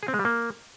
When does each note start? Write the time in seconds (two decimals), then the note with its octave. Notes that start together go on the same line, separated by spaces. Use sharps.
0.03 G#4
0.08 C4
0.14 G#3
0.19 G3
0.25 A#3